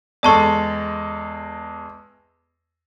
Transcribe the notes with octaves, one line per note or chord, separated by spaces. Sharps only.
E2 G#3 A4 D5 A5 C#6